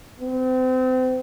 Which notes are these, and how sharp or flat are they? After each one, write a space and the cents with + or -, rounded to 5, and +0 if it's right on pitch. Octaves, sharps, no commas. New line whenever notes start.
C4 -35